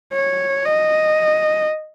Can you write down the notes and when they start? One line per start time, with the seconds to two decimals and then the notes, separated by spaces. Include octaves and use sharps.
0.13 C#5
0.65 D#5